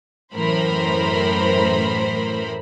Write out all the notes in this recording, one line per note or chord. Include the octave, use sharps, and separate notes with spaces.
F#2 A2 E3 A#4 C5 B5